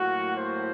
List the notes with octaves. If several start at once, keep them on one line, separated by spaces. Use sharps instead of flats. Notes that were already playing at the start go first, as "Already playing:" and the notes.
Already playing: A2 F#3 A#3 F#4
C5